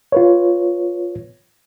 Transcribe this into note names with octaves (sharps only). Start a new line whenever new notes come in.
F4 B4 C#5